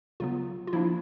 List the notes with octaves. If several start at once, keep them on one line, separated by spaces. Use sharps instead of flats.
C#3 F#3 B3 F4
F4
F3 A#3 D4 E4